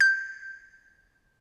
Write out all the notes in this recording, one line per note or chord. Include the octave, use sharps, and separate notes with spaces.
G6